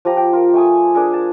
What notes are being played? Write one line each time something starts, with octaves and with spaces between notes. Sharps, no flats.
F3 G4 A#5
G5
F4 A#4
A3 G#5 D#6
D4 G#4 A#4
A5